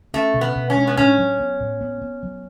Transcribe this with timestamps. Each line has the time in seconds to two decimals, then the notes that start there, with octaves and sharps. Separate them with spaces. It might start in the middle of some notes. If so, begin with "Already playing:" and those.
0.14 A3 C#4
0.34 B2
0.41 B3
0.56 B2
0.70 C#4
0.76 G#3
0.87 B3
0.97 A2 C#4
1.18 F#3
1.40 B3
1.60 A2
1.81 B3
2.02 B3
2.23 F#3